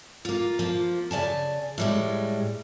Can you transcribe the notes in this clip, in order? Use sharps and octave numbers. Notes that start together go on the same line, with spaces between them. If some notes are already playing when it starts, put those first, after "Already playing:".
A#3 F4
F3 A#3
C#3 D5 G#5 A5
A2 G3 G#3